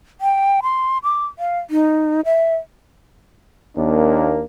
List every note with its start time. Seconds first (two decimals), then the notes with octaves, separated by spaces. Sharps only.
0.21 G5
0.63 C6
1.03 D6
1.39 F5
1.70 D#4
2.25 E5
3.77 D#2 A#3 D4